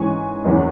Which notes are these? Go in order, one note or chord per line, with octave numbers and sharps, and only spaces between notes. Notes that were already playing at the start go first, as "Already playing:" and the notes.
Already playing: G#2 E3 C#4 G#5 C#6
F#1 E2 E3 C#4